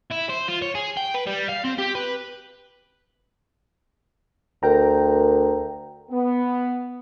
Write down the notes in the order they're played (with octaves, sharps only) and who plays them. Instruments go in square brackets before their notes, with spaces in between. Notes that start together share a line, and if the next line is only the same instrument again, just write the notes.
[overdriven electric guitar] E4
C5
F4
C#5
G#4
G5
B4
G3
F5
C4
G4
B4
[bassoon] D2 [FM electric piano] A#4 G5 A#5
[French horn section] B3